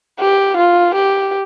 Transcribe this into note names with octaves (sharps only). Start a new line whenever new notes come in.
G4
F4
G4